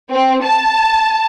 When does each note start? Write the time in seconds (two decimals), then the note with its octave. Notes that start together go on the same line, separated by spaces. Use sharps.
0.12 C4
0.43 A5